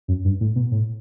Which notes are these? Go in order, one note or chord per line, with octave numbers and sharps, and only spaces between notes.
F#2
G2
A2
B2
A2